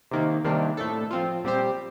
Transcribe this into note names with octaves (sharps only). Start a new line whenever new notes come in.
C3 D#3 A#3
C3 D#3 G3 A#3 D4
A2 A3 D4 A4
F3 C4 F4
A#2 G3 C4 G4 C5